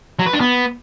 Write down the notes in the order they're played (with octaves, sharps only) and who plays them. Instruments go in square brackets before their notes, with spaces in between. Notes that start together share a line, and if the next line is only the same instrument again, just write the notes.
[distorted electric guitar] F#3
B4
D4
B3